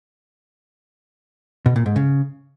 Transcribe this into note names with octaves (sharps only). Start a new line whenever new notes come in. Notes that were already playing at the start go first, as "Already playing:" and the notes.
B2
A#2
G#2
C#3